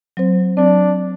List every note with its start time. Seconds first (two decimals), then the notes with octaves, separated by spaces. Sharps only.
0.17 F#3 C4 C5
0.57 F#3 C4 D4